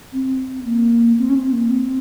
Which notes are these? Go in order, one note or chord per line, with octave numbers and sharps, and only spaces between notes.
C4
A#3
C4
C#4
C4
A#3
C4